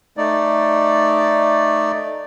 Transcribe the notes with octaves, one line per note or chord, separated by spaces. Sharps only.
A3 D#4 D5